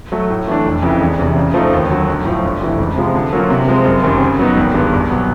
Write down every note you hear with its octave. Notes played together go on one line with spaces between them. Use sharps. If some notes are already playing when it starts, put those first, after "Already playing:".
F#3 A3
A2
E3 A3 D4
F1
F2 C#3 E3
E1
E2 C3
C#3
F3 A3 C4 D#4
D#2
D3 F#3
B1
A2 F3
G1
F2 C3 E3 A3
C#2
C3 F3 G#3
D3
F#3 A#3 C#4 F4
C3
F3 G#3 C4
F#1
F#2 D#3 G3 C4
C#3
F#3 B3 D#4
G#1
G2 D#3 G#3 B3
C2
B2 F#3 B3